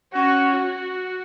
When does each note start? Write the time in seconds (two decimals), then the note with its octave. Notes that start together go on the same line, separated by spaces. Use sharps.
0.13 C#4 F#4
0.53 F#4